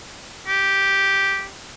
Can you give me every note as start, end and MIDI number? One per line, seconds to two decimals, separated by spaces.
0.48 1.46 67